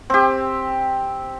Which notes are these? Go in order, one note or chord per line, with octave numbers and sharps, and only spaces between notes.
C4 G4